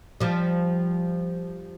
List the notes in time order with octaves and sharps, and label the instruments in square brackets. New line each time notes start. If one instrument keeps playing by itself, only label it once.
[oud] F3 G3